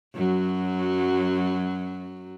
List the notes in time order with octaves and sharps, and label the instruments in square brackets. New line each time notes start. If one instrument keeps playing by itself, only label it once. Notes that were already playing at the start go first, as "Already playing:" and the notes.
[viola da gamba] F#2 F#3